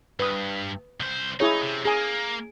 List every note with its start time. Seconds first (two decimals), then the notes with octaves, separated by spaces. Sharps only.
0.20 G2 B4 D#6
1.00 C2 C5
1.40 D#4 E4 G#4 C#5
1.62 C3
1.85 A#3 G#4 G#5